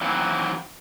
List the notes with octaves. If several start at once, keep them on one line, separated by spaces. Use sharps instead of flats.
D#3 E3 F#3 A#3 C4